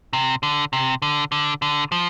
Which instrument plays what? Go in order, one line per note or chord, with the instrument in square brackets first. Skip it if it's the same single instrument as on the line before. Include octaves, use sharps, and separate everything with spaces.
[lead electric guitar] C3
D3
C3
D3
D3
D3
F3